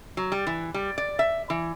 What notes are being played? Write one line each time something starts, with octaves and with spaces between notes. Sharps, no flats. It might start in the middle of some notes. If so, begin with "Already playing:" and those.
F#3
G3
E3
G3
D5
E5
E3